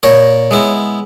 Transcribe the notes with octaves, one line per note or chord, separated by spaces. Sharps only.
A#2 A#4 C#5
G#3 B3 E4